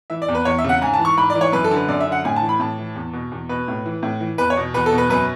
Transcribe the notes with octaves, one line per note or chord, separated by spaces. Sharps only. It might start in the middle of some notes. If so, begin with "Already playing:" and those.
E3 E5
D5
E2
B4
E2 C#5
E5
C#3 F#5
G#2 G#5
A5
E3
C#6
G#2 B5
D5
E3
C#5
F#2 B4
A4
D3
B4
F#2 D5
E5
D3
F#5
A2 G#5
A5
E3
B5
A2 A5
E3
E2
B2
E2
B2 B4
A2
E3
A2
E3
E2 B4
C#5
B2
E2 B4
A4
B2
B4
F#2 B4